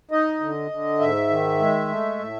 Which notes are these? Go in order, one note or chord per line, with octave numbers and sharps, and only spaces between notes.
D#4 D#5
D3
D3
G#2 E5
D#3
G#3
A3
A2